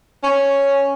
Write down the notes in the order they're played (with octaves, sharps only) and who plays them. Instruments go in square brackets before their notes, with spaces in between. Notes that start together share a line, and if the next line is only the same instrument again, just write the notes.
[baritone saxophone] C#4